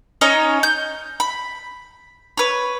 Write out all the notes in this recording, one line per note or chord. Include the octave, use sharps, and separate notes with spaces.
C#4 D#4 C#5 D#5
G6
B5
B4 C#5